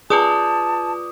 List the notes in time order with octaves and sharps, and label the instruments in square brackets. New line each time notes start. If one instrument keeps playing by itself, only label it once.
[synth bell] F4 B4 D5 [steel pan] G#4 [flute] A5 [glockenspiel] D6 D#6